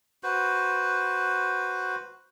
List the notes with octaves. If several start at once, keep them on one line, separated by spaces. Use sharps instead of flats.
F#4 B4 C5